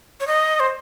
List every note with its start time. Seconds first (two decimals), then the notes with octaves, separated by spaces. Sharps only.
0.20 C#5
0.27 D#5
0.60 C5